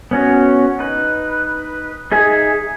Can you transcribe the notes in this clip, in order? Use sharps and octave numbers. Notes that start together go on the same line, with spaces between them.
B3 C#4 F#4
D#4 B4
D#4 G#4 E5 G#5